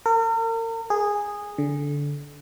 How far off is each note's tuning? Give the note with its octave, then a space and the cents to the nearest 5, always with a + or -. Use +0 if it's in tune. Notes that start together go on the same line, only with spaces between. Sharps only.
A#4 -40
G#4 -10
D3 -20